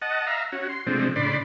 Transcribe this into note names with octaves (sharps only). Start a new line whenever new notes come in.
D#5 F#5 A5
E5 F5 A#5
C#4 F#4
C6
C3 F3 G#3 A3 C4 D4
A2 C#3 D4 D5 B5 C6